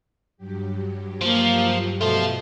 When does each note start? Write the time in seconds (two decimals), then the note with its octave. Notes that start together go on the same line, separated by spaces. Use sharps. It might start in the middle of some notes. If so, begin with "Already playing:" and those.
0.37 G2 F#3 G4
1.21 F3 A#3
2.01 B2 A3 F4 C5